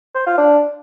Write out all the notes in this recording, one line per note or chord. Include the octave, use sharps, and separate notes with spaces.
C5
F4
D4